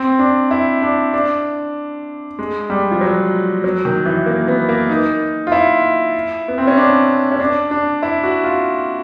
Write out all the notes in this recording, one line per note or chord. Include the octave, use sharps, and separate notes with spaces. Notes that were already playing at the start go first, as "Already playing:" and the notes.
Already playing: C4
D4
E4
D4
D4
G#3
G3
F3
F#3
F#3
D#3
E3
A#3
B3
A#3
D#4
F4
E4
B3
C4
C#4
D4
C#4
D4
D4
E4
F#4
F4